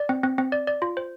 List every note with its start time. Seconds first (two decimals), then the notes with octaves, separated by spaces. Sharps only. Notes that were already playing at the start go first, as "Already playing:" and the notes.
Already playing: D5
0.09 C4
0.24 C4
0.38 C4
0.52 D5
0.67 D5
0.82 F4
0.97 C5